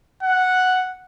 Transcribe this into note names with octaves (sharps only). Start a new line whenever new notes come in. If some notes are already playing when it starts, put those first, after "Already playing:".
F#5